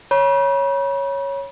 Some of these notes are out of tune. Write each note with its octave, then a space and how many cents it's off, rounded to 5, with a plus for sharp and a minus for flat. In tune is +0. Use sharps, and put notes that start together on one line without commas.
C#5 +0 B5 -40